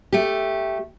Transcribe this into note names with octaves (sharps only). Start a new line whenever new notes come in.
A3 G4